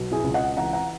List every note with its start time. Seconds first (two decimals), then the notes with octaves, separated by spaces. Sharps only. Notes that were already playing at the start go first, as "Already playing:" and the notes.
Already playing: B1 B2
0.11 E4 G#4
0.24 C#2
0.34 D#5 F#5
0.56 E3 F#5 A#5
0.73 F#5 A#5